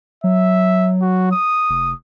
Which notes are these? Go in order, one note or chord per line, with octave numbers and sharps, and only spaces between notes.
F#3 E5
F#4
D#6
F1